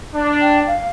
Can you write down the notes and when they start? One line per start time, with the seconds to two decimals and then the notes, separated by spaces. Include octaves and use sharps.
0.15 D4
0.41 G5
0.67 F5